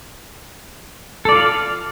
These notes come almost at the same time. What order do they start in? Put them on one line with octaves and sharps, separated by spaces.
A4 D5 F4 F5